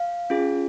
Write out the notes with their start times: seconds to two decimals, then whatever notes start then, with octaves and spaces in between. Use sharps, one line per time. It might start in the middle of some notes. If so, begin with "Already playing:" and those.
Already playing: F5
0.30 C#4 F4 G#4